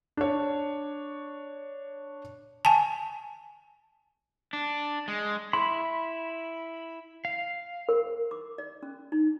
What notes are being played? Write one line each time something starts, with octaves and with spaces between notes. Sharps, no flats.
D4 C#5
G#5 A5
D4
G#3
E4 B5 C6
F5
A#4
D6
D5
C#4
D#4